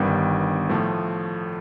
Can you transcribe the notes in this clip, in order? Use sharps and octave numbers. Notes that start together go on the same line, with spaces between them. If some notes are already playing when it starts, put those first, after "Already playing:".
Already playing: G1 G2 D#3 G3 B3
A2 F3 A3